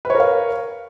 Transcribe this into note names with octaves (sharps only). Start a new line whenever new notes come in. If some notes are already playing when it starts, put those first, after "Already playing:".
A#4 B4 C#5 F5